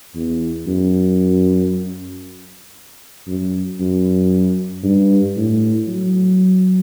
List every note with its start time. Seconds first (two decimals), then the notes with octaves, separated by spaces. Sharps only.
0.15 E2
0.67 F#2
3.28 F#2
3.80 F#2
4.84 G2
5.36 A2
5.88 F#3